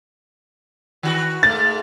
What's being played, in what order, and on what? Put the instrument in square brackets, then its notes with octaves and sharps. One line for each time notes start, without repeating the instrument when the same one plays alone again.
[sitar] D#3 F#4
[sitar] G#2 A3 [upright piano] A6